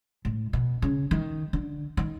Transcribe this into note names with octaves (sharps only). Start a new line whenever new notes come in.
A2
B2
C#3
D#3
D3
D#3